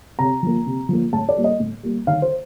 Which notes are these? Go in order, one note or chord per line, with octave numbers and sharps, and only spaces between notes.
C3 A#5
F3 A#3
C3
F3 A#3
A2 A5
D5
G3 A#3
D#5
A2
G3 A#3
D#3 F5
C5